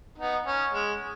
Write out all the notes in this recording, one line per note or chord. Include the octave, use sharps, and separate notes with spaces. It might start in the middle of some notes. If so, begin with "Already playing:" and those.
B3 D#4
C#4
G#3